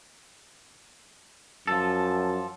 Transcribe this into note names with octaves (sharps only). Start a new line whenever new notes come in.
F#2 F3 A4